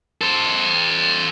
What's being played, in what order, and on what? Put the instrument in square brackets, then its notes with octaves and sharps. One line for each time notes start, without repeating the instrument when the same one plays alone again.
[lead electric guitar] A4 C5